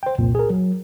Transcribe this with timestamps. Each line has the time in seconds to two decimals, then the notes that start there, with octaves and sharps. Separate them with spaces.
0.03 C5 G5
0.18 C2 F2 A#2
0.35 G#4 A#4
0.50 F#3